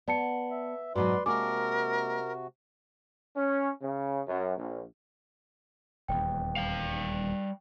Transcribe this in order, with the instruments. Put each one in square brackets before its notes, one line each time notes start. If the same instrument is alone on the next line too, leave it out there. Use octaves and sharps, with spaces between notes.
[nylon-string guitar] B3 [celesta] D5 A5 C#7
[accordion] E5
[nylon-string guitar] G#2 B2 F#3 [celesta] F#4 [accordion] B4 D5 C6
[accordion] C3 F#4 [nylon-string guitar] G#3 A#3 D4 [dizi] A#4 [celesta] G#5 D6
[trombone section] C#4
C#3
F#2
A#1
[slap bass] D#1 E2 [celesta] G5
[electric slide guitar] G3 F5